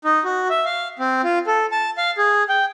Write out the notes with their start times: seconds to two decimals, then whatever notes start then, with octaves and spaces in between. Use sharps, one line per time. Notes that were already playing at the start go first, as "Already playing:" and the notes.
0.05 D#4
0.24 F#4
0.50 E5
0.65 F5
0.99 C4
1.24 F4
1.47 A4
1.72 A5
1.98 F5
2.18 G#4
2.49 G5